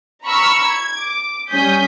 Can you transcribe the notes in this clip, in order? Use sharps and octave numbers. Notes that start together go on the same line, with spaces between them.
A#5 B5 C#6 E6 F6
G#6
D6
G3 C#4 G#5 D#6 G6 B6